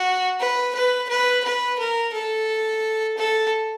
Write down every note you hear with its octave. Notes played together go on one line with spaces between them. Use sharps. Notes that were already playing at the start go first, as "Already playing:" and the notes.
Already playing: F#4
B4
B4
B4
B4
A#4
A4
A4